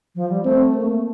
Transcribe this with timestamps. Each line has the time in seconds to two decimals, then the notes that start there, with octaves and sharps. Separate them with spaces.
0.15 F3
0.30 G3
0.44 A3 C4
0.74 A#3